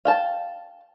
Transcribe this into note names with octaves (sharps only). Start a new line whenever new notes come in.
F5 G5 A5